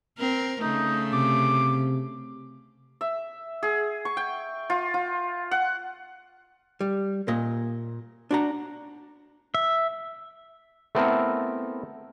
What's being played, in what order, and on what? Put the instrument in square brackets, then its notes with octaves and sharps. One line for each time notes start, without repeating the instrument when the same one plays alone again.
[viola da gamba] C4 A#4
[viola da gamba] C#3 A3 [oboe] D#4
[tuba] C3 [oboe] D6
[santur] E5
G#4
C#6
G5
F4
F4
F#5
[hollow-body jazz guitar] G3
A#2 D#5
D4 F#4 A#5
[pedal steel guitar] E5
[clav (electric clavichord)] A3 B3 C4 E4 A4 A#4